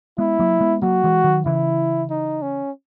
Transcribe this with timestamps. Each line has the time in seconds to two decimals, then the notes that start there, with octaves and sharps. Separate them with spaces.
0.18 G#3 B3 E4
0.40 F#3 A#3
0.61 G#3 B3
0.82 F#3 A#3 F#4
1.04 E3 G#3
1.24 D#3 F#3
1.46 C#3 E3 E4
2.10 D#4
2.42 C#4